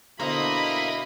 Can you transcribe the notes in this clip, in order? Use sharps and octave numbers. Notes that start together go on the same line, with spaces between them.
B2 D3 E4 A#4 C5 D#5 F5 B5